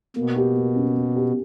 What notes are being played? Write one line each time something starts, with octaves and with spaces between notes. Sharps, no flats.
B2 A#3
G4
A#3
C#4
A#3
G4